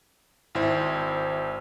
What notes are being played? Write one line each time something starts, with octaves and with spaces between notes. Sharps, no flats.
G#1 E4 C5